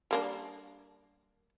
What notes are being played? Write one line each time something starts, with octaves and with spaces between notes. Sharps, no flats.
G3 A#3 D4